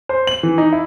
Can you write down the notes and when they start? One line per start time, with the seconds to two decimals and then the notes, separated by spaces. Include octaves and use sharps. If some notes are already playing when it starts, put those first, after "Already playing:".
0.09 C5
0.27 F#7
0.43 E3
0.58 D#4
0.73 E4